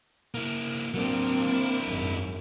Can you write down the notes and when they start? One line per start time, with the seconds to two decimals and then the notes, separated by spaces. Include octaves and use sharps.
0.34 A#3 E4
0.94 F#3 A#3 C4 D4
1.47 D4 E4
1.87 G#1 F#2